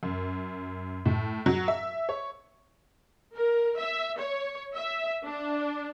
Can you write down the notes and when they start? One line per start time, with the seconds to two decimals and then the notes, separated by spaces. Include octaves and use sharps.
0.03 F#2
1.06 A2
1.46 F#3
1.68 E5
2.09 C#5
3.34 A#4
3.78 E5
4.19 C#5
4.75 E5
5.24 D4